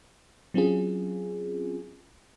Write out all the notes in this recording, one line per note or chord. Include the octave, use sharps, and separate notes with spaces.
F#3 C4 C#4 F4 G#4